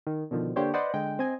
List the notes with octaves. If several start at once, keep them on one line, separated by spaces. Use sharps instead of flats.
D#3
B2 D3 D#3 F3
D3 A#3 D4 G4 C5 C#5
B4 C5 D5 D#5 F#5
D3 G#3 G5
C4 D#5 G#5